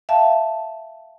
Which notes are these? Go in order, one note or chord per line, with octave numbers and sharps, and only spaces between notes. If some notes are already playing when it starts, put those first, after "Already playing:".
E5 F5 G5 A5